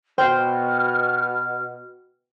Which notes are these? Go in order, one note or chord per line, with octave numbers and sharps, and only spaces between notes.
B2 C5 G5 F6